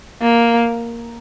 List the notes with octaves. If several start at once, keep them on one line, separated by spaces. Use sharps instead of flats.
A#3